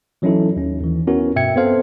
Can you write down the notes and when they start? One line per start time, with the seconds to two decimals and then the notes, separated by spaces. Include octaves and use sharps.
0.22 E3 F#3 C#4 D#4 E4 A4
0.56 D#2 C#4
0.80 D#2 E3
1.07 B3 C#4 E4 F#4 A#4
1.36 G2 B2 E5 G5 G#6 C#7
1.56 B3 C4 A4 C5 F5